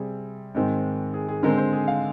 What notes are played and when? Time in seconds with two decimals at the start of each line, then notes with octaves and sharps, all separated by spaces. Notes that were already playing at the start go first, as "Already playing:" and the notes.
Already playing: C3 G3 C4 G#4
0.55 G#2 D#3 G#3 C4
1.14 G#4
1.29 G#4
1.43 D3 G#3 C4 A#4
1.58 C5
1.73 G#4
1.88 F5